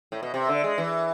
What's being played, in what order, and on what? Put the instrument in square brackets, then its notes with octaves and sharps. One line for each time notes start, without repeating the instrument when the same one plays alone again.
[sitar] A2
B2
C3
D3
G#3
E3